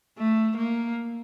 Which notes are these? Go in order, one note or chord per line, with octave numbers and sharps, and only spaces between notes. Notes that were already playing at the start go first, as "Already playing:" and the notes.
A3
A#3